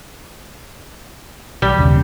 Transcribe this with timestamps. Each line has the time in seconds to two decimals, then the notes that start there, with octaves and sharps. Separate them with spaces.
1.62 B1 G3
1.76 E1 D#2 C#3